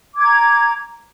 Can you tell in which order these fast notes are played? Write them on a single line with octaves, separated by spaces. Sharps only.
D6 G#6 A#5